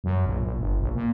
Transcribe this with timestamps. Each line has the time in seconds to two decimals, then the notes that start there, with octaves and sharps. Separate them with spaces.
0.04 F#2
0.26 A#1
0.44 A#1
0.59 G1
0.80 A#1
0.95 A#2